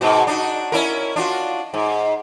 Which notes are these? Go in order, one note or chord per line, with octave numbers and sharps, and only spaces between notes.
G#2 B2 F#4
D4 D#4 F#4
C#4 E4 A#4
D4 F4 F#4
G#2